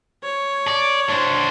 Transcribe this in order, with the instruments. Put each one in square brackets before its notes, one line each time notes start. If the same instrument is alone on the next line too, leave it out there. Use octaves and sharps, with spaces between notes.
[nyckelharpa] C#5
[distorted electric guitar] D5
D4 C5